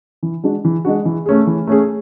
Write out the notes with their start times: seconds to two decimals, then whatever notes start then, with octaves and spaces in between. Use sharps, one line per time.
0.23 E3
0.44 G#3 D4 F#4
0.65 E3
0.85 G#3 D4 F#4
1.05 E3
1.26 A3 C#4 G#4
1.47 E3
1.67 A3 C#4 G#4